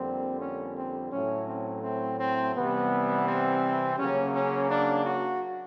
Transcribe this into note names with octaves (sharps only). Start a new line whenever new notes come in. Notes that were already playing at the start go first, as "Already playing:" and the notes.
Already playing: F2 D3 G3 A#3 C4
C#4
C4
A2 F#3 A3 C#4
C4
C4
C4
C3 E3 G3 B3
C4
C#3 F#3 A#3 C#4
C#4
D4
F#4